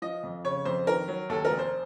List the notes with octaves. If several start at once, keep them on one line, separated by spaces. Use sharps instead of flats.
F3 D#5
F2
C#3 C#5
F2 C5
D#3 A#4
F#3
D#2 A4
A#4
F1
C5